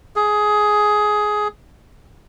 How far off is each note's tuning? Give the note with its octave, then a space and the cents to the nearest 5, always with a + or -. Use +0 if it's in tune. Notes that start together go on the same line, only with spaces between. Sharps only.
G#4 +15